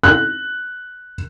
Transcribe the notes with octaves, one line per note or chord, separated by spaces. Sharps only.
F#6